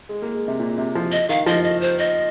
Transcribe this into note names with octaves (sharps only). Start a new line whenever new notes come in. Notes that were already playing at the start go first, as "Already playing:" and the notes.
G#3
A#3
G#3
C3
A#2
C3
F3
D#5
D#3 F5
F3 D#5
D#5
C5
D#5